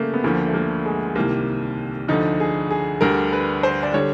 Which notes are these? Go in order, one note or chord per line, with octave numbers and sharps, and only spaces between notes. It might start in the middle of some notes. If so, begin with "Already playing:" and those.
Already playing: C#3 G3 A3 A#3
B3
D2 D3 F3 A#3
A3
A#3
G#3
C2 C3 D#3 G3 A#3
D2 D3 F3 D#4
G#4
G#4
D2 D3 G3 A#4
B4
C5
D5
D3 G3 C#5